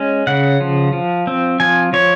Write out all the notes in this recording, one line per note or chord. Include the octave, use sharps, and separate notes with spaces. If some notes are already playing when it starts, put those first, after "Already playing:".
Already playing: G#3 C#4
C#3 F#5
F3
F3
C4
F3 G#5
F3 C#5